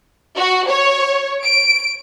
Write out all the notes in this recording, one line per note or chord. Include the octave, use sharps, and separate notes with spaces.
F#4
C#5
D7